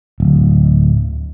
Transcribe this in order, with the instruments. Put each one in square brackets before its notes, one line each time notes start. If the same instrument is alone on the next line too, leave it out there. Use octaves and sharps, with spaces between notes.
[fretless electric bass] D1